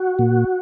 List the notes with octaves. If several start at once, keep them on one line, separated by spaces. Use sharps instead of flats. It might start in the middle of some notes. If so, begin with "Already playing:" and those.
Already playing: F#4
A#2